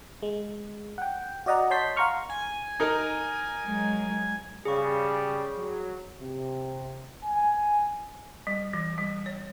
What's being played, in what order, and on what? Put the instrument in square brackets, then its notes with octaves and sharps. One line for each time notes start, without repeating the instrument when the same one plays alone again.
[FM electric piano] G#3
F#5 G5
F#4 D5 D#5 F#5 A#5
C#5 D#5 A5 C6 G6 B6
F5 F#5 A#5 C6 C#6 F6
[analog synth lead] G#5
[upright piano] D#4 A#4
[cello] F#3 G#3
[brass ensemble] C#3 G3 [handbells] G#4 C#6
[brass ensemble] F#3
C3
G#5
[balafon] G3
E3
G3
C#5